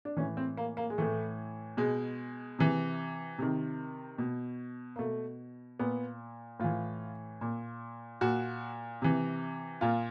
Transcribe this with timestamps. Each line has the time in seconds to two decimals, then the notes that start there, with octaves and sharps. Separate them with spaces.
0.05 D4
0.17 A2 E3 C#4
0.37 C4
0.57 A#3
0.77 A#3
0.90 G#3
0.98 A2 E3 A3
1.77 B2 G#3
2.59 C3 E3
3.39 C3 D#3
4.18 B2
4.96 A#3
4.99 B2 A3
5.79 A#2 B3
6.60 A2 E3 F4
7.41 A#2
8.21 A#2 F#4
9.02 C3 E3
9.81 A#2 F4